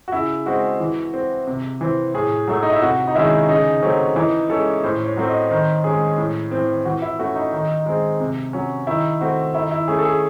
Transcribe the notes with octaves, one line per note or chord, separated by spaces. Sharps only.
F#4
C#3 E4
G#3 C4 F#4
E3
C4
C3
E3 C4
A2 G#4
F#3 A3
D#4
E4
C3 F#4
D#4
D#3 G#3 C#4 E4
C#3 D#4
F#3 A3 C4 C#4
E3 D#4
G#3 C#4 A4
A2 C5
C#5
F#3 A3 C4
D#5
D#3 C5
G#3 C#4 G#4
A2
E3 C4
E3 F#4
E4
A3 C#4 F#4
D#4
D#3
G#3 C4
C3
F#3 C#4
D#3 E4
A3 C4 F#4
D#3 E4
E4
A3 C#4 G#4
A4
G#4